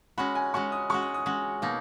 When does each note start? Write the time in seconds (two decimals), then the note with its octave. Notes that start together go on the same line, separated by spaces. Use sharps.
0.18 G#3 C#4 F#4 B5
0.35 G#5
0.54 G#3 C#4 F#4 C#6
0.72 D#6
0.90 G#3 C#4 F#4 C#6
1.02 D#6
1.14 D#6
1.26 G#3 C#4 F#4
1.62 B2 A#3 D#4